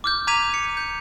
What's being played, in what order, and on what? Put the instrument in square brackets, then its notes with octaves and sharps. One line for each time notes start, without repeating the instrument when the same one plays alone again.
[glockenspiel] D6 F6 G6
A#5 D6 G#6 B6 D#7 F7
C#7
G6